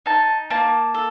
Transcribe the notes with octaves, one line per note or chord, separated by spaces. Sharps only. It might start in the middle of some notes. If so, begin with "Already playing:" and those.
D#4 A5
A#3 A5
A4